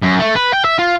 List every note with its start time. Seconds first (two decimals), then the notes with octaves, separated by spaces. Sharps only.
0.02 F#2
0.19 A3
0.35 B4
0.54 G5
0.65 E5
0.79 F4